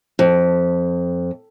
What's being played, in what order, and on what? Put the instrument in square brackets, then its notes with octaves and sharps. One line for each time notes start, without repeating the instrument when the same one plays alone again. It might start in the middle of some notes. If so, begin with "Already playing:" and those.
[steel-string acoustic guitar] F2